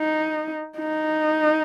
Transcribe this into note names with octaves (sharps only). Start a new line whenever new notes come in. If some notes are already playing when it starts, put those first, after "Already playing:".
Already playing: D#4
D#4